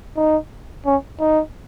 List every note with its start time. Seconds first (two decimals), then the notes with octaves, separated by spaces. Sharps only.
0.16 D#4
0.86 C#4
1.20 D#4